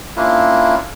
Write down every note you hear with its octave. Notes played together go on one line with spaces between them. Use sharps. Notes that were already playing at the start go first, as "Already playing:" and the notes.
A#3 C#4 D4 E4 F4